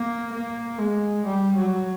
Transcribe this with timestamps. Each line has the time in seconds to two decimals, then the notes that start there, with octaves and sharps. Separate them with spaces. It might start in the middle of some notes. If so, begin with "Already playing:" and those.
Already playing: A#3
0.32 A#3
0.78 G#3
1.25 G3
1.55 F#3